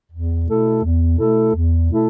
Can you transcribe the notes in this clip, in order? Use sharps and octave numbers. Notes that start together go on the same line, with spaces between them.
E2
B2 A3 E4 A4
E2
B2 A3 E4 A4
E2
B2 A3 E4 A4